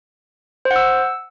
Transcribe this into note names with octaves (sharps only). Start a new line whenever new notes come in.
C5
F#5
E6